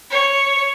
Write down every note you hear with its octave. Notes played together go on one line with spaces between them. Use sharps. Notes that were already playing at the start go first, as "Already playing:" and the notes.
C#5